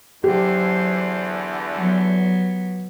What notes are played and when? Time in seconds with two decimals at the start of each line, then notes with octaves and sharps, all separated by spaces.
0.24 E2 D3 F#3 G4 C5
1.76 F#3 B3